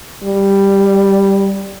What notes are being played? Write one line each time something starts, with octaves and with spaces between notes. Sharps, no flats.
G3